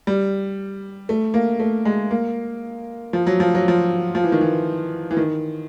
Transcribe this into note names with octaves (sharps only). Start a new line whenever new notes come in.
G3
A3
A#3
A3
G#3
A#3
F3
F#3
F3
F#3
F3
F3
E3
D#3
E3
E3
D#3